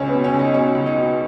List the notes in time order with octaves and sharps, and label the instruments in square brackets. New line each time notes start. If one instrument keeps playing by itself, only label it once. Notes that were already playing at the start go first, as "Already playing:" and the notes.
Already playing: [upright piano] C#2 C#4
B3
B2
C#4
C#2
D#4
B2 C#4
C#2
D#4
B2